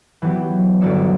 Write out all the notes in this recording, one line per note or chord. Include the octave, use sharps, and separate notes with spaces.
E3 F#3 B3 G4
G1 F#3 F#4 D5 E6 C#7